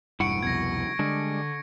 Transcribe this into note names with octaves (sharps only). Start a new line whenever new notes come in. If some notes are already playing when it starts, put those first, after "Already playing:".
E1 G2 E4 F#5 C#6 C#7 D7
C2 F2 B2 G#6 A#6
D3 G3 G#3 D4